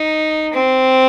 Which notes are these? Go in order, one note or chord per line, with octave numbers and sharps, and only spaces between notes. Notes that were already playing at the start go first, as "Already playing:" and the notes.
Already playing: D#4
C4